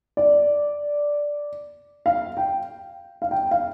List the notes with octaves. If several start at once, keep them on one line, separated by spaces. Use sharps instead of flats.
D5
F5
G5
F5
G5
F5